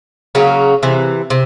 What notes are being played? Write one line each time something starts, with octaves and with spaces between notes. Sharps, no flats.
C#3 F#3 A#3 C#4
C3 E3
C3